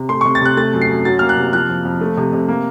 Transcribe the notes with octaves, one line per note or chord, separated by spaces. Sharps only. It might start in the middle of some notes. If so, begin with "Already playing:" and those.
Already playing: C3
A3 C6
C3 C#6
A6
C3 F#6
A3 A6
F#2
C7
F#2
F#3 A6
A#3 F6
F#6
C3
F3 F#6
F2
F2
A3
C3
C3
A#3